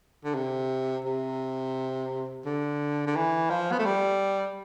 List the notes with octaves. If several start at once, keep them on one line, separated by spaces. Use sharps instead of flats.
D3
C3
C3
D3
D3
E3
F3
B3
A3
G3